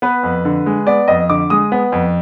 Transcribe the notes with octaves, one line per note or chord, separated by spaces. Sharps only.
B3 B4
F2
D3
G#3
B3 D5
F2 D#5
D3 D6
G#3 D#6
B3
F2